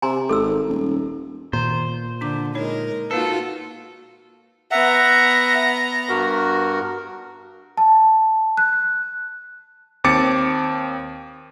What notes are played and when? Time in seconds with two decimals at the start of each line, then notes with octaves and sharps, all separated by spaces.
0.02 C3 G#5 A#5 C6
0.29 G#1 A4 E6
0.69 D#1
1.53 A#2 D#3 C5
2.21 D3 D4 D6
2.55 G#3 D#4 A#4 C#5
3.11 A#3 D#4 F4 F#4 A4 B4
4.71 B3 E5 F#5 A#5
6.09 G2 F#4 A#4
7.78 A5
8.57 F#6
10.04 D#2 C4 D6 A6 C#7